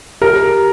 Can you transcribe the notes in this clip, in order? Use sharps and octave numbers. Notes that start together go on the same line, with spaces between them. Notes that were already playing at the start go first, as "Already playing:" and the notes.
G4 A#4